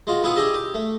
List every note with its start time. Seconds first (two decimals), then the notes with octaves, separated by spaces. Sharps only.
0.07 G#3 F4 F#4
0.23 B3 E4 F4 G#4 F#5
0.36 D4 G4 G#4 D#5 E5
0.54 G4
0.74 A3